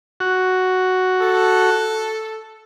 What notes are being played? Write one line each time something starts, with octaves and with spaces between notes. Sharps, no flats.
F#4
A4